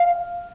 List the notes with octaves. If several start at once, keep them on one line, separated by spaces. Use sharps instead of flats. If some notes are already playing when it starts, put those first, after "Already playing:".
Already playing: F5